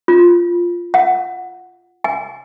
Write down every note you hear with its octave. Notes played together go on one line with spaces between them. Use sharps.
F4
F#5
G#5